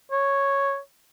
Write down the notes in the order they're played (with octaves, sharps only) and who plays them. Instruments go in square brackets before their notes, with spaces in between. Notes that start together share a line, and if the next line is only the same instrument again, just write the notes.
[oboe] C#5